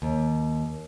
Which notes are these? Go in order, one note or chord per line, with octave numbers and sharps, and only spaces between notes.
D#2